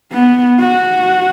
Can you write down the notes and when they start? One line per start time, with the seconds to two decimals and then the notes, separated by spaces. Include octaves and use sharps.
0.12 B3
0.59 F#4